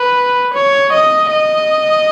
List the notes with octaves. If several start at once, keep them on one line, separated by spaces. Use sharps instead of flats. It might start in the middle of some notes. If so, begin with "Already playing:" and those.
Already playing: B4
C#5
D#5
D#5